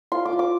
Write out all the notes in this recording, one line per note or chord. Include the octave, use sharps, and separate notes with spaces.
F4 C6
D6
F4
D6